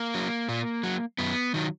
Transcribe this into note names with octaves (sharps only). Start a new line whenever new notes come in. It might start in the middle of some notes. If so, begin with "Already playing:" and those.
Already playing: A#3
F#3
A#2
F#3
F#2 B3
D#3 F#3